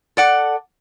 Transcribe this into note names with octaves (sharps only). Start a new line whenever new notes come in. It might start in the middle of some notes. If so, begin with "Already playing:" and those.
A4 D5 F#5